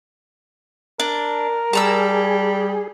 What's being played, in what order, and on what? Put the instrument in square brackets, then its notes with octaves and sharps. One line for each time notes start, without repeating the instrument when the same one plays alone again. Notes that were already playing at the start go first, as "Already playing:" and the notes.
[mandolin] D4 [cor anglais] A#4
[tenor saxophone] G3 [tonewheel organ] G#4 [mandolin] A5 A#5 E6